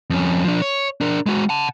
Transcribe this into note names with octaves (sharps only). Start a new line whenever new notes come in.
F2 C#4
F3 D4
C#5
D4 A#4
G#3 F#4
F#5 A5